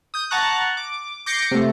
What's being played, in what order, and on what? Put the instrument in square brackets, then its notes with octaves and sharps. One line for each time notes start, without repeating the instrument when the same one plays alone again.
[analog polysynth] D#6 G6
F#5 A5 A#5 C#6 F#6
D6
D6 G6 A#6 C7 C#7
C3 A3